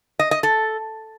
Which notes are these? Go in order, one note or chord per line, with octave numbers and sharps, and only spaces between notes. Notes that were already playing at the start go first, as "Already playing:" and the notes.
D#5
D#5
A4